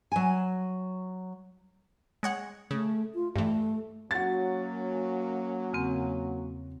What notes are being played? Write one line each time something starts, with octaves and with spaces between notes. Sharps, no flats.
F#3 G#5
G#3 C#5 F#5
C#3 A3
F4
G2 E3 A3
F#3 A#3 C#4 F#4 A6
E2 C#3 C4